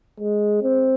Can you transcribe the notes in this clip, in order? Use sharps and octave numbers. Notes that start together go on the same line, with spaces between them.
G#3
C4